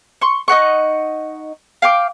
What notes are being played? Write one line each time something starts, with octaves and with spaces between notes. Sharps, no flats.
C6 C#6
D#4 D#5 F#5 C#6
F5 G5 D6